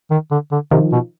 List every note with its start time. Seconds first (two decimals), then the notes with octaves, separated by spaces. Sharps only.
0.11 D#3
0.31 D3
0.52 D3
0.71 C3 D#3 F3
0.92 B2